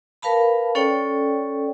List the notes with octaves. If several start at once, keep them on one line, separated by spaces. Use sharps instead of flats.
A#4 B4 F5 A5 B5
C#4 A4 C#5 D5 G5